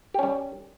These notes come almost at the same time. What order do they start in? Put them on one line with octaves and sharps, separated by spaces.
G4 C#4 G3